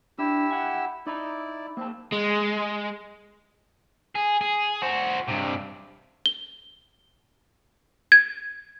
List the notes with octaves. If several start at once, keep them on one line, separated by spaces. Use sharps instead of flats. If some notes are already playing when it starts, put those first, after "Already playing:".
D4 E4 G4 E6
F#5 G#5
D#4 E4 D5 A#5
A#3 C4 A5
G#3
G#4
G#4
F#4 C5
G2 C3
G7
G#6